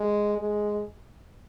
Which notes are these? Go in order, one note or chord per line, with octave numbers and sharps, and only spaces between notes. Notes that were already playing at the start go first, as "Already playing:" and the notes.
Already playing: G#3
G#3